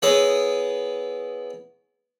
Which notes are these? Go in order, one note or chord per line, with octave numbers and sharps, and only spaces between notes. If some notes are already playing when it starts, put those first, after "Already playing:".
B3 E4 G#4 C#5 D#5 E5